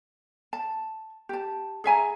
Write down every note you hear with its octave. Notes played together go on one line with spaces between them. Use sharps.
A5
G4 A5
G#4 E5 G#5 A#5